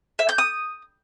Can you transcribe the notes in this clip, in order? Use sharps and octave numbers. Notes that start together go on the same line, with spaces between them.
E5
G6
D#6